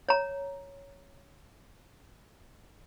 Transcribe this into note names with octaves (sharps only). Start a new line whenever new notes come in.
C#5 A#5